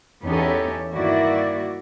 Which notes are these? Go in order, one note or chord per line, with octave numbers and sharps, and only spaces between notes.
E2 B3 C#4 D#4 G4 A4
G2 D#3 A#3 E4 F#4 D5